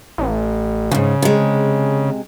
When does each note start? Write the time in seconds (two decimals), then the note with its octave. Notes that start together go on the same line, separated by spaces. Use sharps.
0.18 A1
0.91 F2 G#2 C#3
1.22 C3 G#3